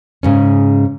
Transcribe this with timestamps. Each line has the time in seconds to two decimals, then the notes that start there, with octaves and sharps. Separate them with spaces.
0.23 G#2 C#3 C#4